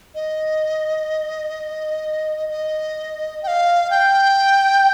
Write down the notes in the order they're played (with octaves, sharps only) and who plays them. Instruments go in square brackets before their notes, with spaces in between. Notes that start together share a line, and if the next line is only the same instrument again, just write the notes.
[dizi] D#5
D#5
G5
F5
G5